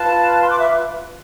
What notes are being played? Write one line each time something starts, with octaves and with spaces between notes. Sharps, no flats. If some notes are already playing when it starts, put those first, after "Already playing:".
Already playing: F4 B4 A5
C6
D6
E5